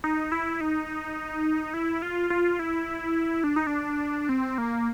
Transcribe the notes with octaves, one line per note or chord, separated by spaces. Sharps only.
D#4
E4
D#4
E4
F4
F4
E4
D4
D#4
D4
C4
A#3